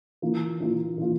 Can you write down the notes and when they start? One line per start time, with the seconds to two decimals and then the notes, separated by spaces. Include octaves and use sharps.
0.22 E3 A#3 F4
0.60 E3 A#3 F4
0.98 E3 A#3 F4